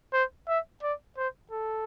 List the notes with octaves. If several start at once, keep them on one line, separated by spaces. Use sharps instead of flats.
C5
E5
D5
C5
A4